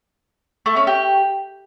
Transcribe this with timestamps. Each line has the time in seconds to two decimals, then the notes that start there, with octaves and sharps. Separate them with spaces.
0.66 A3
0.76 C#4
0.87 G4